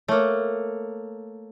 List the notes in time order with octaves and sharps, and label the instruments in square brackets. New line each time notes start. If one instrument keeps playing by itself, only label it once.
[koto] A3 A#3 [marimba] C#5